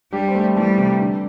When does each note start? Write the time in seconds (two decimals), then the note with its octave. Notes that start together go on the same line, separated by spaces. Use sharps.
0.12 G3 D4 G4
0.28 C4
0.35 A3 D4
0.56 E3 G3 A3
0.78 C3 E3
1.00 D3